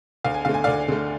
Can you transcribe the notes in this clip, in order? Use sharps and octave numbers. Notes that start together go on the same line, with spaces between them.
D2 F5
G#5
D3 A3 F5
G#5
D2 D5 F5
D3 A3